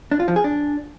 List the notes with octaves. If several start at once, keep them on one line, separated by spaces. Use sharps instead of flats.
D4
F4
F3
G#4
D4